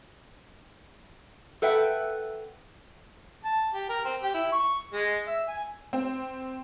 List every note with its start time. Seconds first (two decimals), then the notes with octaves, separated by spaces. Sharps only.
1.62 A4 B4 E5 F#5 G5
3.44 A5
3.74 G4
3.89 A#4
4.04 C4
4.23 G4
4.34 E4
4.52 C#6
4.93 G#3
5.27 E5
5.48 G#5
5.93 C4